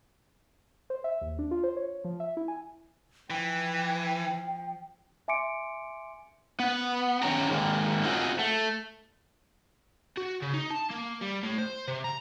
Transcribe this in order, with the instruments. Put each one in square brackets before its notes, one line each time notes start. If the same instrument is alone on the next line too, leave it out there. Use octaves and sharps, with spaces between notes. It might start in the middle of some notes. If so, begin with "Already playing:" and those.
[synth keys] C5
E5
D#2
D4
F4
C5
C#5
F3
E5
E4
G#5
[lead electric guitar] E3 [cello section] F3 [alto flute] G5
[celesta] E5 G#5 C6 D6 C#7 D7
[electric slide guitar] B3
D#3 C#4 C#5 G5 A#5
D#3 G#3 A#3
C4 D#4 F4 F#4 G#4
A3
[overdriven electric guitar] F#4
C#3
D#4
A5
A#3
G3
A2
C5
C3
A#5